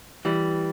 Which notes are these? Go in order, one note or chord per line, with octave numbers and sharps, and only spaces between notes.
E3 G3